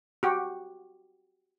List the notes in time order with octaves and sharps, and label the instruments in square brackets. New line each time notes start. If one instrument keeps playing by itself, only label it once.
[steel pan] F#4 G4